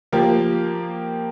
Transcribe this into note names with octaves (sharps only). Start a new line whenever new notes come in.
F3 A#3 G4